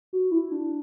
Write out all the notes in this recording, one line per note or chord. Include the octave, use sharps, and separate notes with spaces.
F#4
E4
D4